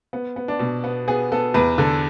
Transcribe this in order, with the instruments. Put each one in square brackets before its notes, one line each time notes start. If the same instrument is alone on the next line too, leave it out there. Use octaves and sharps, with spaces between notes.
[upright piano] B3
B3
D4
B2
B3
B3 G#4
B3 A4
E2 B4
D3 A4